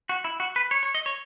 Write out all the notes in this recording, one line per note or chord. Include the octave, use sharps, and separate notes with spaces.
F#4
E4
F#4
B4
C#5
C#5
D#5
C#5